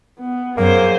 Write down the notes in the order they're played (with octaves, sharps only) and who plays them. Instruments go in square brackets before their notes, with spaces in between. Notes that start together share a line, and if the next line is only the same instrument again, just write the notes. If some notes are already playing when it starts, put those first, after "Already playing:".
[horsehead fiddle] B3
[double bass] F#2 [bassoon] A#3 [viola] G#4 C5